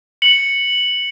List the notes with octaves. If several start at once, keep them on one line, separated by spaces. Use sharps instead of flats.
C#7 F#7